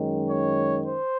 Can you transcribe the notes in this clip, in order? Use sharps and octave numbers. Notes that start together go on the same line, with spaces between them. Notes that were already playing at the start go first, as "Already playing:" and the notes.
Already playing: F#2 D#3 G#3 C#4
C#5
C5